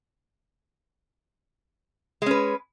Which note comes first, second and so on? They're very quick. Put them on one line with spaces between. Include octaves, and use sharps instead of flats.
G#3 C#4 B4